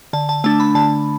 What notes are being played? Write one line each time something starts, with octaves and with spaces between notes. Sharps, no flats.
D3 A5
A5
A3 D4 A5
B5
D3 A5